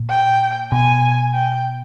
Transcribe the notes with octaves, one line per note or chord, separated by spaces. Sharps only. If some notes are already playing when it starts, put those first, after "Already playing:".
Already playing: A#2
G5
B2 G#5
G5